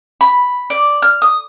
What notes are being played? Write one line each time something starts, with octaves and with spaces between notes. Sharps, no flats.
B5
D5
F6
D#6